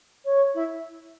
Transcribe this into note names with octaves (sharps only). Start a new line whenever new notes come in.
C#5
E4